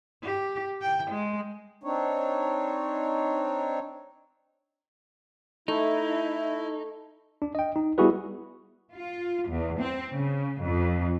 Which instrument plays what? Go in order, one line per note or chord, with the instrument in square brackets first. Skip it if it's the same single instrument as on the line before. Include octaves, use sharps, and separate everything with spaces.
[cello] G4
G5
G#3
[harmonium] C4 D4 D#4 C#5
[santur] A3 [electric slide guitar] D#4 [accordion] E4
[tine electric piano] D4
D#5 G5
D#4
G3 B3 E4 F#4 G#4 B4
[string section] F4
E2
C4
C#3
F2